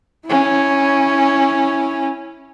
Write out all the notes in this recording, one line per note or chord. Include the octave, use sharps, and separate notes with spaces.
C#4 E4